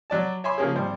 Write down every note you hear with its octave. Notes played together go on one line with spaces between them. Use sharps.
F#3 D5 A5
C#5 E5 G#5 B5 C6 D6
C#3 F3 A#3 C#4 G#4
G#1 G3 C5